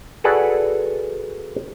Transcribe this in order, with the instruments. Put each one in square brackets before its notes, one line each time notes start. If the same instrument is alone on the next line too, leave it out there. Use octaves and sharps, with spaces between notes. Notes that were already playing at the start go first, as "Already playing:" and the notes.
[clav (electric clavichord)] F#4 G#4 A4 B4 D5 F#5